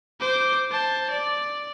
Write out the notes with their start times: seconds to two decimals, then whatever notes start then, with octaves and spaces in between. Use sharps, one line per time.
0.20 C5 D6
0.71 C5 A5
1.10 D5